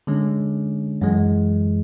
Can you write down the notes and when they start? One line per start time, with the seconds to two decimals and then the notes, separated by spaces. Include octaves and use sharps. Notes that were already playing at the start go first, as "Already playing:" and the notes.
0.07 D3 G#3 C#4
1.01 F#2 E3 G#3